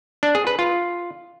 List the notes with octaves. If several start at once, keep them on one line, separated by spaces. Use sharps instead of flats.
D4
G#4
B4
F4